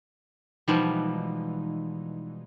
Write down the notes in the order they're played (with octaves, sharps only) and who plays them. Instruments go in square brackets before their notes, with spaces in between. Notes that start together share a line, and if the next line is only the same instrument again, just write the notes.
[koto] B2 F3 G3 [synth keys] E3 G#3 D#4